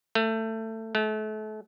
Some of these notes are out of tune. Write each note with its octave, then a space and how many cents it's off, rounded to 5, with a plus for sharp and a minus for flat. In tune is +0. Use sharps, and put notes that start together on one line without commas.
A3 +20
A3 -35